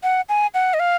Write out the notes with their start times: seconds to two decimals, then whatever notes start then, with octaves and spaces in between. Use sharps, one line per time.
0.03 F#5
0.29 G#5
0.54 F#5
0.74 D#5
0.80 F5